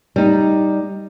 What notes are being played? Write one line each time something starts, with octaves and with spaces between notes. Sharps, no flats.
G3 D#4